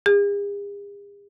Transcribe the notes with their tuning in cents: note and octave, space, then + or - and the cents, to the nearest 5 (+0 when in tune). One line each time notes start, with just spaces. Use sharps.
G#4 -45